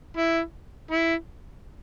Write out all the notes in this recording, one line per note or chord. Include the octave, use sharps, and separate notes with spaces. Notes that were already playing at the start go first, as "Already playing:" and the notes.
E4
E4